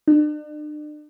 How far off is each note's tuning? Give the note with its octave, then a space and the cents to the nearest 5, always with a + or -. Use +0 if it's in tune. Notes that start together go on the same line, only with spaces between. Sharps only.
D4 +40